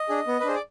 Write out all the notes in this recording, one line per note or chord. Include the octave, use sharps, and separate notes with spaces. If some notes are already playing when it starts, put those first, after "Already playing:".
Already playing: D#5
D4 G#4
B3
B4
D4 G#4 C5
D5